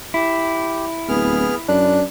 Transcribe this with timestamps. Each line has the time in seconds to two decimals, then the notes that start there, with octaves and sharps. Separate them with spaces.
0.14 E4 G4
1.09 D1 B3 G#4 F6
1.69 F#2 D4 F#6